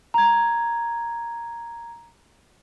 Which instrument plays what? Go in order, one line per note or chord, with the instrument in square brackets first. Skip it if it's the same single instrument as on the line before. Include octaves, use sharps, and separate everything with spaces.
[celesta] A#5 G#6